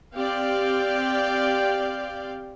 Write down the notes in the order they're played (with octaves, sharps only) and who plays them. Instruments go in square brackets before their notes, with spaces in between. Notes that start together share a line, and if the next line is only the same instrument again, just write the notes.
[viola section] C4 G4 D5 F5 G5